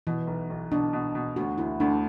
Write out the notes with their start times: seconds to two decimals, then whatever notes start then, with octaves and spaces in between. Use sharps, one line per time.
0.07 B2 E3
0.27 B1
0.50 B1
0.71 B2 D4
0.93 B2
1.15 B2
1.36 D2 F#4
1.58 D2 E4
1.80 D2 D4